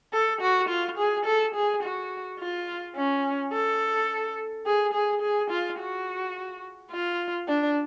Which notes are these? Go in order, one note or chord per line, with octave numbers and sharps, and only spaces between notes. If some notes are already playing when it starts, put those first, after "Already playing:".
A4
F#4
F4
G#4
A4
G#4
F#4
F4
C#4
A4
G#4
G#4
G#4
F4
F#4
F4
D4